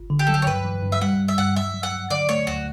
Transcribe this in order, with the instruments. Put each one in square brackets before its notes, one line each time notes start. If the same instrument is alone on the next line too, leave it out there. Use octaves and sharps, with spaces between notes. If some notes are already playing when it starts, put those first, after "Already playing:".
Already playing: [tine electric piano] G1
D3
[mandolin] G4
[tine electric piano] F#3 [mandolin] A4
[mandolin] G4
C#5
[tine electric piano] G2 [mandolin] B4
[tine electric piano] E3
G2
[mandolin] E5
[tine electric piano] G3 [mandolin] F#5
[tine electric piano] G2
[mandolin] E5
[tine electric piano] G2 [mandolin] F#5
[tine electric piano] F#3 [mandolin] E5
[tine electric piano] F#3
[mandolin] F#5
[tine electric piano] F#3
[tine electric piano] D3 [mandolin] D5
[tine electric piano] A3 [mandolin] C#5
[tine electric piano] D2 [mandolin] F#4